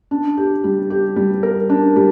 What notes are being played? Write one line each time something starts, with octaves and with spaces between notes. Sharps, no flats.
D4
G4
G3
G4
G3
A#4
D4
G3